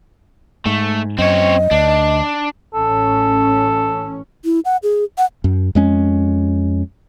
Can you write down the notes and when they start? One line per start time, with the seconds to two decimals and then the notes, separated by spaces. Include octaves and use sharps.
0.66 G#2 A3
1.19 F#2 C4 C#5 D#5
1.71 D2 D4
2.74 A1 C#4 A4
4.45 E4
4.65 F#5
4.83 G#4
5.18 F#5
5.44 F#2
5.75 F2 G#3 C#4